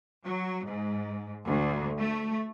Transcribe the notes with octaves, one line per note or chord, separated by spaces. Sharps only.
F#3
G#2
D2
A3